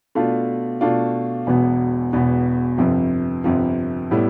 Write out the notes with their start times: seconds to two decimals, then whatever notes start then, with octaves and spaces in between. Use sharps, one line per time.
0.15 B2 A3 D4 F4
0.81 B2 A3 D4 F4
1.47 E1 E2 B2 B3
2.13 E1 E2 B2 B3
2.78 G1 F2 C3 F3
3.44 G1 F2 C3 F3
4.11 A2 G3 B3 E4